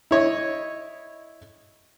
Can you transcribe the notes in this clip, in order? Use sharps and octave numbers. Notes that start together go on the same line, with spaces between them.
E4 C#5 D#5